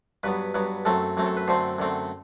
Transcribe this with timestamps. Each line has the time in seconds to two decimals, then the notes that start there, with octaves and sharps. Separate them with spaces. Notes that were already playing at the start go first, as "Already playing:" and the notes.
0.23 G2 F#3 B3 B4
0.54 G2 F#3 B3
0.85 F#2 F#3 A3 C4 A4
1.17 F#2 F#3 A3 C4
1.26 A4
1.37 B4
1.48 F#2 D3 A3 C4 C5
1.79 F#2 D3 A3 C4